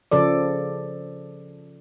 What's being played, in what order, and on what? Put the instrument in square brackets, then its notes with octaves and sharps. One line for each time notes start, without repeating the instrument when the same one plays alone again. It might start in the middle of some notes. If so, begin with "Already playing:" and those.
[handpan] C#3 F3 A4 D5